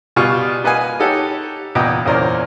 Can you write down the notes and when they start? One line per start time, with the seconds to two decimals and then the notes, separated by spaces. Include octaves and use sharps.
0.16 B2 G3 F4 G#5 C#6
0.64 A#3 B4 D#5 F#5 G#5
0.99 D#4 G4 A4 C#5 F#5
1.75 E2 A#2 B3 D#5 G5
2.06 E2 A#2 C#4 A#4 C5 D5